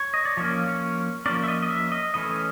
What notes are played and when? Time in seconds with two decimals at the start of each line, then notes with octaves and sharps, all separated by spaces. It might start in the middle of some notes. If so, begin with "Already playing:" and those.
Already playing: C#5
0.14 D#5
0.25 D5
0.37 F3 A#3 C#4 C#5
0.67 C#5
1.26 F3 A#3 C#4 D5
1.44 E5
1.48 D#5
1.62 D#5
1.70 E5
1.92 D#5
2.14 E3 A3 C#4 D#5